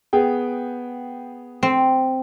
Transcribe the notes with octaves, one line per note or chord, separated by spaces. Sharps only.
B3 G#4 G5
C4